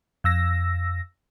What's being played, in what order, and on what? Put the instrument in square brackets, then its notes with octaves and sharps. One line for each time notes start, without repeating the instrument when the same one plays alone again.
[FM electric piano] F2 E6 A#6